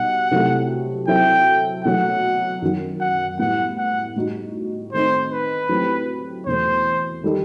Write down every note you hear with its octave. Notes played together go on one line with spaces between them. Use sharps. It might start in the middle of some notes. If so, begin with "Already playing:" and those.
Already playing: B2 G3 D#4 F#5
C3 F#3 A3 E4
F#3 C4 E4 A4 E5 G5
B2 F#3 A3 F#5
F#2 D#3 F#3
F#5
A2 G3 B3 E4 F#5
F#5
A2 G3 D#4 F#4
D#3 A3 C4 D#4 C5
B4
F#3 A3 C4 E4 G4
E2 B2 A3 C5
D#3 G3 D#4 A4